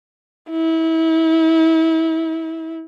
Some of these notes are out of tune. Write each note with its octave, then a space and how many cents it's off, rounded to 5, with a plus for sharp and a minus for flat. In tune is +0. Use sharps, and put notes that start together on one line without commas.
E4 -30